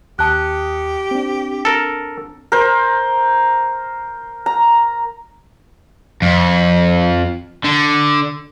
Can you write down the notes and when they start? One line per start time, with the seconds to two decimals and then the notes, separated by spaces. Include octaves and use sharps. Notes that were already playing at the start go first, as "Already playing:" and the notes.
0.19 D#2 G4 A5 D#6 F#6 C#7
1.11 C4 D4
1.65 A4 A#4
2.52 A#4 C5
4.46 A#5
6.22 F2
7.65 D3